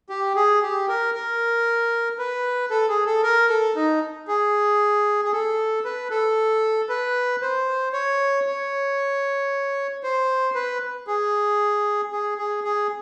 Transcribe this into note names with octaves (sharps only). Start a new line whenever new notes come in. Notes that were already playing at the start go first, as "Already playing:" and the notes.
G4
G#4
G4
A#4
A#4
B4
A4
G#4
A4
A#4
A4
D#4
G#4
G#4
A4
B4
A4
B4
C5
C#5
C#5
C5
B4
G#4
G#4
G#4
G#4